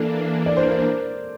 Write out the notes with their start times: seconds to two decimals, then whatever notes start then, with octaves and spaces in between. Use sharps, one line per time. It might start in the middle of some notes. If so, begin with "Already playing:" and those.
Already playing: E3 A#3 D4 A4
0.46 D5
0.57 C5
0.67 A#4
0.78 C5